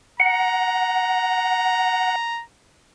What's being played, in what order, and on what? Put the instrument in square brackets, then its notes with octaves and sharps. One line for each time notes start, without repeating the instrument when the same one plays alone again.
[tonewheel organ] F#5 [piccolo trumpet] A#5